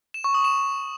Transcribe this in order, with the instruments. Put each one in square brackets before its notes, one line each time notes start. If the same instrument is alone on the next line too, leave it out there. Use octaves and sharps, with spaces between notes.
[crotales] E7
C#6
D#6
E7